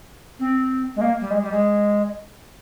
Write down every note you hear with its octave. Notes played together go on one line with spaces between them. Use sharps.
C4
G#3
A#3
G3
G#3
G3
G#3